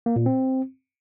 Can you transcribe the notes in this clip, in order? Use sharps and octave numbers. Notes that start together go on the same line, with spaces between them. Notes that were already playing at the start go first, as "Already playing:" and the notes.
A#3
A#2
C4